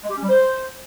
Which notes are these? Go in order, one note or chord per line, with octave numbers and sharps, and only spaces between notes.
G#3
G4
C#4
G3
C5